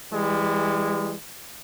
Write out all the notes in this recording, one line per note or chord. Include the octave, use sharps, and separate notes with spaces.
E3 G3 G#3